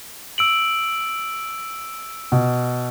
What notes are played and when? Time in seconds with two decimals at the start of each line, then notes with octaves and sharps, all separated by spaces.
0.38 E6 D7 F#7
2.32 B2